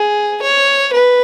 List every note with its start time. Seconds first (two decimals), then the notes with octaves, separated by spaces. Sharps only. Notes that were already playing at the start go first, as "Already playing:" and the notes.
Already playing: G#4
0.42 C#5
0.93 B4